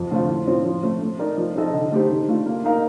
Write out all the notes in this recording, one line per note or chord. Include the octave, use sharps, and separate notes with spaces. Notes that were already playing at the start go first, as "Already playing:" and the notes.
Already playing: F2
D3 A3 C4 F4
A2
F3 C4
F3
A3 C4
A3
D#4 A#4 D5
F3
C4 D#4 A4 D#5
D3
A3 D#4 G4 C5
D#3
A3 D4 F4
A#3
D#4 A#4 F5